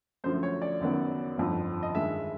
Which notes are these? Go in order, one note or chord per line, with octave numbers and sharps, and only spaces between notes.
F#2 D3 F3 A3 C5
C#5
D5
F#1 F#2 D#3 F#3 B3
G1 F2 D3 F3
D#5
G2 D#3 G#3 E5